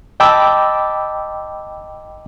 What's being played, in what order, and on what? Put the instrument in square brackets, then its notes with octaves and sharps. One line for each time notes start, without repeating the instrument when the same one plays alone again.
[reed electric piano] D#5 G5 A5 B5 D6 E6